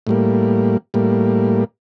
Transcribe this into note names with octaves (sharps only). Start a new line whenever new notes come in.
A2 G3 A#3
A2 G3 A#3